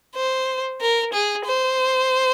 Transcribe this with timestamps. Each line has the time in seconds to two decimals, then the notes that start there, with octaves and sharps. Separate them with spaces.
0.15 C5
0.81 A#4
1.13 G#4
1.46 C5